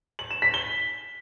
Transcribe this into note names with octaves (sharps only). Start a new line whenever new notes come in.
F#7
E7
B6
G7